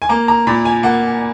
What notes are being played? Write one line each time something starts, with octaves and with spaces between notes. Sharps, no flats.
G#5
A#3 A#5
A#5
A#2 B5
G#5
A#3 F#5